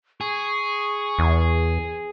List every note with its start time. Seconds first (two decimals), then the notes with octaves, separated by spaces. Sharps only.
0.21 G#4 C#6
1.19 E2